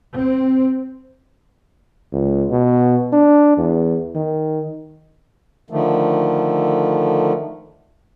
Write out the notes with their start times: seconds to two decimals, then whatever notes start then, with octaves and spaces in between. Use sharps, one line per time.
0.14 C4
2.12 C#2
2.50 B2
3.13 D4
3.58 E2
4.15 D#3
5.70 D3 D#3 F3 A3